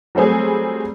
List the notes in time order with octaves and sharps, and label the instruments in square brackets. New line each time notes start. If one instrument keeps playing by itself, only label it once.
[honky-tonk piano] F#3 G3 A3 C4 G#4